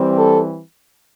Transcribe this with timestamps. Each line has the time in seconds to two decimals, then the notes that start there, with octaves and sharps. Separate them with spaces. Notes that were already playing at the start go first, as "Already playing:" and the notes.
Already playing: E3 G3 C4
0.17 A4